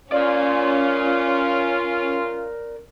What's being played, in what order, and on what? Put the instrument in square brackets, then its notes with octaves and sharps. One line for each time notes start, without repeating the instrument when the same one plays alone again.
[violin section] C#4 [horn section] F4 [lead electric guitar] A#4 D5